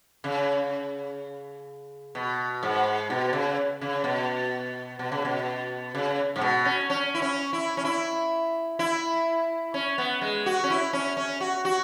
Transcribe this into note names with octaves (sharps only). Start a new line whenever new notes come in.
C#3
B2
G#2
B2
C#3
C#3
B2
B2
C#3
B2
C#3
G#2
B2
C#4
C#4
E4
C#4
E4
C#4
E4
E4
C#4
B3
G#3
F#4
C#4
E4
C#4
C#4
F#4
F#4